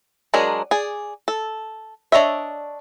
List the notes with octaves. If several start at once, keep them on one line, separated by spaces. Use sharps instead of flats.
F#3 G#3 D4 G#4 A#4
G#4 D5
A4
D4 C#5 D#5 E5